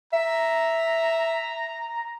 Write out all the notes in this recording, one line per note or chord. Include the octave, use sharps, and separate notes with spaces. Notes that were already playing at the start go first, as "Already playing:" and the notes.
E5 A#5